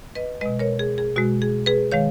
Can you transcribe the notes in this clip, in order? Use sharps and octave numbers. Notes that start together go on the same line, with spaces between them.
B4 D#5
B2 G#3 B4 D#5
A#4 C#5
G#4
G#4
B2 G#3 F#4
G#4
G#4 B4
D#3 G#3 C#5 F5